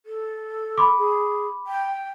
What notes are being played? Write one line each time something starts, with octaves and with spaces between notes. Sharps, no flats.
A4
B5 C6 D6
G#4
G5